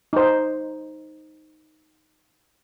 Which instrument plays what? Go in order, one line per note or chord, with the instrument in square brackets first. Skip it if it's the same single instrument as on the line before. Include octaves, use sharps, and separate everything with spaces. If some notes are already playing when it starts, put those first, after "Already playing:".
[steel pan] D#4 C5